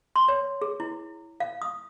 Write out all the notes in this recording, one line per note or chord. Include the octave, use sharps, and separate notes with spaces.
C6
C#5
G#4
E4
F5
D#6